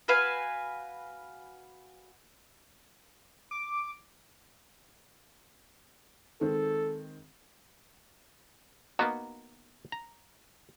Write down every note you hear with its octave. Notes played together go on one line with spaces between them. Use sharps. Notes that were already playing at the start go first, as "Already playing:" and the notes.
F#4 B4 F5 G#5
D6
D#3 G#3 C4 A4
A#3 B3 D#4 F#4
A#5